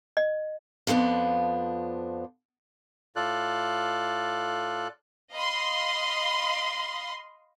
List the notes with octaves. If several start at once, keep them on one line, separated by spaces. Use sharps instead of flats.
D#5
F2 F3 G3 B3 D4
A2 F4 A4 D5 F#6
D#5 F5 B5 C6